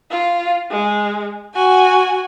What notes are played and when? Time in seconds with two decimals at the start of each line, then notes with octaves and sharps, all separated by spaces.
0.11 F4
0.71 G#3
1.54 F#4 G#5